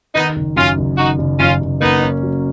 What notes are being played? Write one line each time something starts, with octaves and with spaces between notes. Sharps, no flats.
D#3 B3 D#4
F#1
F#2 C#4 F4
F#1
D#3 D#4 F#4
F#1
F#2 C#4 F4
F#1
A#3 B3 D#4
C#4
F#3